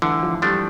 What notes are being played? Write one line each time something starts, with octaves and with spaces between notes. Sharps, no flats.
D3 E3
F3
F3 G3 A3 D4